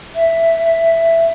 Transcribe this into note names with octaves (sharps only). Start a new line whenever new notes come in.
E5